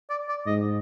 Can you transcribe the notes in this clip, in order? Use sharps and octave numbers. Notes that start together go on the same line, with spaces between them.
D5
D5
G#2 D#5